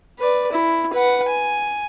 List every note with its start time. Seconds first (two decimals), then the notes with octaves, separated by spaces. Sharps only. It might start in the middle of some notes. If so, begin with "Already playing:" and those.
0.19 B4 D5
0.52 E4
0.93 B4 F#5
1.29 G#5